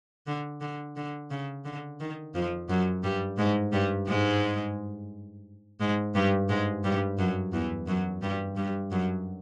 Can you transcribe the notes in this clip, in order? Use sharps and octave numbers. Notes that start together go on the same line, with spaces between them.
D3
D3
D3
C#3
D3
D#3
F2 F3
F#2 F#3
G2 G3
G#2 G#3
G2 G3
G#2 G#3
G#2 G#3
G2 G3
G#2 G#3
G2 G3
F#2 F#3
E2 E3
F#2 F#3
G2 G3
G2 G3
F#2 F#3